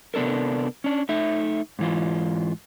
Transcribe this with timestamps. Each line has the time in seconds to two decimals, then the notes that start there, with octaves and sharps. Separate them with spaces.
0.14 C3 B3 D4 A4 A#4
0.84 C#4 D4
1.09 A3 D#4 E5
1.79 G#2 E3 F4